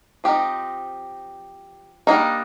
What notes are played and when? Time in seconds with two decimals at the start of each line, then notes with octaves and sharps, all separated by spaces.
0.24 F3 C4 D#4 G4
2.07 G3 A#3 D4 D#4